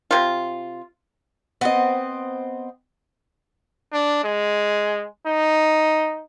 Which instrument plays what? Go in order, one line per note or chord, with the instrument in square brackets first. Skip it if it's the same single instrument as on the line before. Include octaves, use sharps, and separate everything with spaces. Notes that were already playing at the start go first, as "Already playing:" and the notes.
[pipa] C3 F4
[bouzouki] B3 C4 D#5
[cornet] D4
G#3
D#4